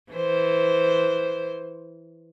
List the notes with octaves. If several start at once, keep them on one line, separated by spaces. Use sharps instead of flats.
E3 C5